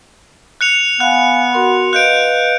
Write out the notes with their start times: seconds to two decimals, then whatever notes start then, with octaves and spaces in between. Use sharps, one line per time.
0.61 F#6 C#7 F7
1.00 B3 F5 G#5 F#6
1.53 F#4 A#4 C6
1.93 B4 D#5 F5 F#6 G6 D7